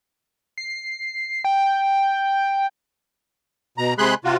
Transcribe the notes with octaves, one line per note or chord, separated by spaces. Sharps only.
C7
G5
B2 A#5
C3 G#3 G#4 B5 C6 F#6
C3 F4 F#4